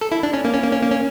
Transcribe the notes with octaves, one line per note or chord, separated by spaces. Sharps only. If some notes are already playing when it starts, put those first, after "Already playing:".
A4
E4
D4
C#4
A#3
C#4
A#3
C#4
A#3
C#4